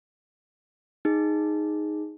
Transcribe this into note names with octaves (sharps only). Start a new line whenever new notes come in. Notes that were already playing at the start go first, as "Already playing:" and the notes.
D#4 G#4